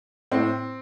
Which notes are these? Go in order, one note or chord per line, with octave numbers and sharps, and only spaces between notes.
A2 C4